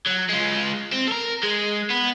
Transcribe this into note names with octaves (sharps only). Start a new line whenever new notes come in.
F#3
G#3 F4
C4
A4 A#4
G#3
B3